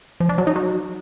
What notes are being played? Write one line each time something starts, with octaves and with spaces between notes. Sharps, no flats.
F3
D4
F#3
D#4
F#3